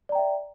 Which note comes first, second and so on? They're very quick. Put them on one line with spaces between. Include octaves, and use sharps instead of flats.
D5 A#5 G5 E5